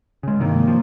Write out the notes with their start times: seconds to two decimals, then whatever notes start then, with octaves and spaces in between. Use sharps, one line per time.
0.23 C#3 G#3
0.39 G2 C3 D#3 A#3
0.67 F3